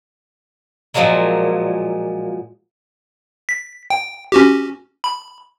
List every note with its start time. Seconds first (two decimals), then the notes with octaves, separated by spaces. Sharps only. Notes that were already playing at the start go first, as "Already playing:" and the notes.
0.94 A#2 F3 F#3 G#3 A#3
3.49 B6
3.90 G5
4.32 C#4 F#4 G4
5.04 B5